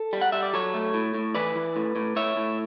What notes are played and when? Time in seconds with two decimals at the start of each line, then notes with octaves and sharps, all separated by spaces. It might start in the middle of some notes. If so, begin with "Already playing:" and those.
Already playing: A4
0.13 G3
0.21 F#5
0.32 G3 E5
0.43 D5
0.53 F#3 A4 C#5
0.74 A3
0.94 A2
1.14 A2
1.34 E3 B4 D5
1.56 E3
1.76 A2
1.96 A2
2.16 A2 C#5 E5
2.36 A2